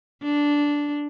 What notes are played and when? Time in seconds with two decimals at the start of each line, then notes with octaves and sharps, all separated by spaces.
0.23 D4